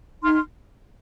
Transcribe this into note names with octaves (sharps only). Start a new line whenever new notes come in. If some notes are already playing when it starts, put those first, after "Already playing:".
D#4 C6 F6